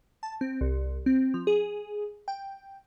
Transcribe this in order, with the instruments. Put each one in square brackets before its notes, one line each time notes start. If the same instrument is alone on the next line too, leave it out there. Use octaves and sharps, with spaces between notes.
[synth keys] A5
C4
C2
C4
F3
G#4
G5